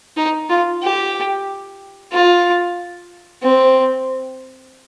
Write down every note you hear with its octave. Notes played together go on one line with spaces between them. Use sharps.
D#4
F4
G4
F4
C4